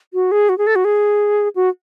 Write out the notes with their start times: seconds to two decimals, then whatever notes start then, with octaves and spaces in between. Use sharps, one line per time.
0.14 F#4
0.32 G#4
0.49 F#4
0.58 G#4
0.67 A4
0.76 F#4
0.85 G#4
1.56 F#4